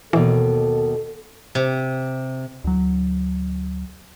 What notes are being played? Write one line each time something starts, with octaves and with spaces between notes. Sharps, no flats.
D#2 B2 E3 A4
C3
D2 F#3